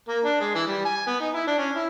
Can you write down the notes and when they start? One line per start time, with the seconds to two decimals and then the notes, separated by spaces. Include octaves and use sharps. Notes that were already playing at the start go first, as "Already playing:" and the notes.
0.08 A#3
0.25 D4
0.40 G#3
0.55 E3
0.68 G3
0.85 G#5
1.07 B3
1.20 D#4
1.34 E4
1.47 D4
1.58 C#4
1.75 E4